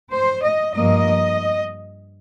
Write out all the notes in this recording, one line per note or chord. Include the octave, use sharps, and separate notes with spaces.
C5
D#5
G2 F3 A#3 D#5